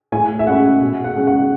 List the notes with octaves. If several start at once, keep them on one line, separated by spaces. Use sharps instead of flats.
A2 G#5
E5
G#3 C#4 E4 F#5
B2
F#5
G#3 C#4
F#5